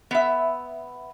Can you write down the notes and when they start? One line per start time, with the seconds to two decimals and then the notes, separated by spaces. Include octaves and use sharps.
0.11 B3 E5